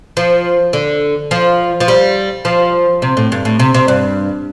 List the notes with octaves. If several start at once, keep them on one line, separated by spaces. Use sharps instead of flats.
F3
D3
F3
F3
G3
F3
C3
A2
G2
A2
C3
C3
G2